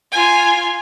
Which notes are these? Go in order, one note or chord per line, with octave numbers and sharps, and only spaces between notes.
F4 G#5